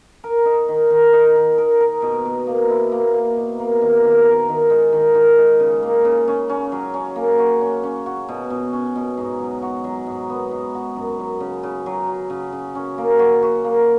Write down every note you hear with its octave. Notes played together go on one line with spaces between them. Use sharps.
A#4
D#4
D#3
D#3
D#4
D#3
A#4
A#4
B2
B2
A#3
E4
A#3
A#3
B2
A#3
D#3
D#3
A#4
D#3
G#3
D#3
D#3
G#3
C#3
A#3
C#3
C#4
C#4
F#3
C#4
A#3
F#4
C#4
C#4
F#4
B2
B2
C#4
B2
G#2
F#3
F#4
F#3
G#2
B3
G#2
F#4
F#2
F#2
C#3
C#3
F#3
F#3
C#3
C#3
C#4
A#3
F#4
F#4
A#3